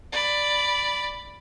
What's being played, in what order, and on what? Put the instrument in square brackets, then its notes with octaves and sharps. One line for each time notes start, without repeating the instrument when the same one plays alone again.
[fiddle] D5 B5